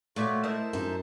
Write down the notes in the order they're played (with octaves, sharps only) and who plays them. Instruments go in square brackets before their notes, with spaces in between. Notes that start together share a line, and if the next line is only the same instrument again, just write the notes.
[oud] A#2 D5 E5 [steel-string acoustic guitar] A3 [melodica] F4 F#4 C#5
[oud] E4 A#4 D#5 [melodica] C5 E5 A5
[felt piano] F#2 [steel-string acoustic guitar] D#4